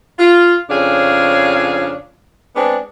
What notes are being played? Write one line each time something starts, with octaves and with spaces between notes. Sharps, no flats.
F4
F2 C#3 D4 G#4 C#5 F5
G#3 B3 C4 D4